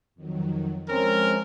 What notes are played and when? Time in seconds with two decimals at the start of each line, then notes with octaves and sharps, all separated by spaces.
0.15 F2 D#3 F#3
0.89 F3 G#3 C4 C#4 A#4